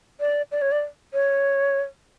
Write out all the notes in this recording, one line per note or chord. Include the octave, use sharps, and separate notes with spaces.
D5
D5
C#5
D5
C#5